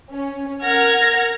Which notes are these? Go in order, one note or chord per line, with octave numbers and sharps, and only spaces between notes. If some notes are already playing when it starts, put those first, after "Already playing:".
C#4
A#4 F#5 F6 G#6 A#6